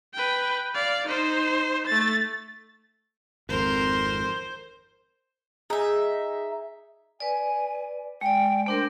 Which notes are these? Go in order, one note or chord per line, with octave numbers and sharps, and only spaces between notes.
B4 G5
D5 F5
D#4 C5
A3 A6
G#1 F2 A#4 C5 C6
D#4 G#4 E5
B4 D5 G#5
G#3 D5 G5
A3 D4 A#4 C5